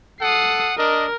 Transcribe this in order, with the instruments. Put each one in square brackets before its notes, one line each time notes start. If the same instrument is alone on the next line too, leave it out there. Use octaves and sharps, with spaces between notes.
[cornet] A4 [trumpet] F#5 [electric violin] D#6 C7
[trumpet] D4 [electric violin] A#4 [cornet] D#5